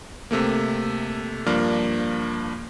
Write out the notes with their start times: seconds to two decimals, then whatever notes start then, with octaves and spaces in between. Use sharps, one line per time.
0.31 C3 A3 A#3
1.46 G2 F3 A#3 D4 F6